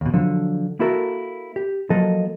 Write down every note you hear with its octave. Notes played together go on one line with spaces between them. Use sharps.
D#2 B2
D3 F3 F#3
A#3 E4 F#4 A4 A#4
G4
F3 F#3 A#3 A4 D#5